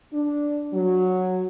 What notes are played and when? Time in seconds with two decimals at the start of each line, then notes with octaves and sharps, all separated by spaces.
0.14 D4
0.73 F#3